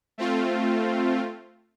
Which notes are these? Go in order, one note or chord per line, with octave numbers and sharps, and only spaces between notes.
A3 C4 F4